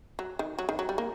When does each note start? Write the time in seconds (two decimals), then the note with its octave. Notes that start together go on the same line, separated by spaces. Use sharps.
0.19 F#3
0.39 D#3
0.59 F#3
0.69 D#3
0.79 F#3
0.89 G3
0.98 A#3